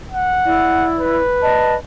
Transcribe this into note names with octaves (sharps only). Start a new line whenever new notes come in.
F#5
E4 D5
B4
D5 D#5 A5